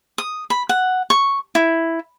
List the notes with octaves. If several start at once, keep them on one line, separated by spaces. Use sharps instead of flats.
D#6
B5
F#5
C#6
E4